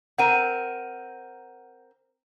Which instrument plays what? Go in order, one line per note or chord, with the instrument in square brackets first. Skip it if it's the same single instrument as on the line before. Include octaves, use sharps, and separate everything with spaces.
[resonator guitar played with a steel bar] C4 A#4 [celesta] F#5 D#7